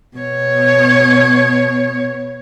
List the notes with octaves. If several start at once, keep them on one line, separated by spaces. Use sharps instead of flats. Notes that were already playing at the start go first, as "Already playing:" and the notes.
B2 C#5